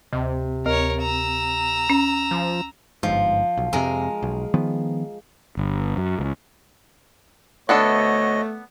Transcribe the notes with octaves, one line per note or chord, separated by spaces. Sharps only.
D2 C3
D2 A#4 C#5
A#5 E6
C#4
F3
G1 G#2 F3
B1
F2 C3 G#3 A#4
B1
D#3 F3 B3
G1
F#2
C#2
D2 A3 B3 D4 A4 C#5 D#5